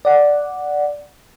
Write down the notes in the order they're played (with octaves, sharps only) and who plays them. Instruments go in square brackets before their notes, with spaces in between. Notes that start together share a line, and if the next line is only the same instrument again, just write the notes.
[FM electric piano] D5 F#5